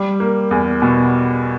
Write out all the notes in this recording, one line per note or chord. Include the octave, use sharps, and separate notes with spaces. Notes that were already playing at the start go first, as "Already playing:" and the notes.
Already playing: G3
A#3
E2
B2